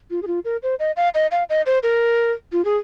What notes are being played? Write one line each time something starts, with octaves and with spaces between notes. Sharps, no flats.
F4
G#4
F4
A#4
C5
D#5
F5
D#5
F5
D#5
C5
A#4
F4
G#4